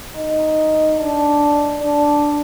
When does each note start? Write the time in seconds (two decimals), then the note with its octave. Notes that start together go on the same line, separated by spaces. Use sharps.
0.15 D#4
0.98 D4
1.81 D4